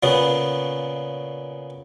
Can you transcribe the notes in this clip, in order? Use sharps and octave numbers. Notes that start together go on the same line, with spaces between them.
A#2 C#3 B3